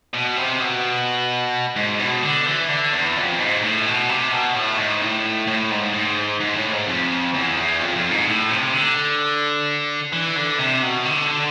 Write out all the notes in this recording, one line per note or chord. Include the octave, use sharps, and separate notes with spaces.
B2
C3
B2
G#2
B2
D3
E3
D3
E2
F2
G#2
A2
B2
C3
B2
A2
G#2
A2
A2
G#2
G#2
G#2
A2
G#2
F2
E2
E2
F2
F2
G#2
A2
C3
D3
E3
D3
C3
B2
D3